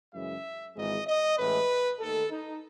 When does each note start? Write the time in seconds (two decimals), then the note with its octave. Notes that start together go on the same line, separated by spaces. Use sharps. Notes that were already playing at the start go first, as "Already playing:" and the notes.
0.13 F#2 C#3 E3 G#3 E5
0.75 G#1 G#2 E3 G#3 D#5
1.06 D#5
1.38 A1 A2 E3 G#3 B4
1.99 D#2 D#3 A3 A4
2.30 D#4